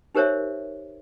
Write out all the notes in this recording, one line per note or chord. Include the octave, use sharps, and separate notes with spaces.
D#4 G4 A#4 C5 C#5 E5